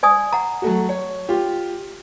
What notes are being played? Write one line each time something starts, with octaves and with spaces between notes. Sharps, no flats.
D5 G#5 D#6
F#5 A#5
F#3 A3 F#4
C#5
F4 G4